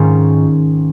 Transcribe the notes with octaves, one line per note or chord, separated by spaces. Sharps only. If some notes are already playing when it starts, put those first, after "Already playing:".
Already playing: G#2 D#3 C#4 F4